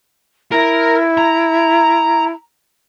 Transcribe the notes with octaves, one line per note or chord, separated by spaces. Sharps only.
E4 A#4
A#5